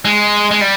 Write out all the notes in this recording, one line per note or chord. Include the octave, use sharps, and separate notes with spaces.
G#3
G#3
G3